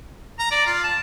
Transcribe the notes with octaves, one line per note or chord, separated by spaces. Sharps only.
A#5
D5
F4
A5